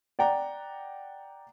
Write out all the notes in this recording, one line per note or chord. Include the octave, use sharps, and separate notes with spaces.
D5 F#5 G5 A#5